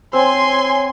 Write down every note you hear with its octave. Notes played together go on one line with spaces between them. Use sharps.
C4 C#5 G#5 C6